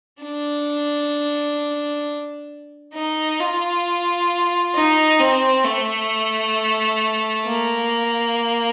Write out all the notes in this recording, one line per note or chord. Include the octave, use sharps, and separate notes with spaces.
D4
D#4
F4
D#4
C4
A3
A#3